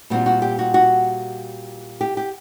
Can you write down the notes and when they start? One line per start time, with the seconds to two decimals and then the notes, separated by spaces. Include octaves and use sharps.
0.10 A#2 G3 C4 F4 F#4
0.26 F#4
0.42 G4
0.59 F#4
0.74 F#4
2.01 G4
2.17 G4